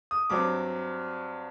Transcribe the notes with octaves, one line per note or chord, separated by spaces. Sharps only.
D#6
G2 F#3 C4 D6